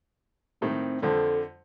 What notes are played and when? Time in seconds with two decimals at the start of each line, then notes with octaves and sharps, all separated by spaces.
0.62 A2 D#3 C4
1.02 F2 D3 F3 A4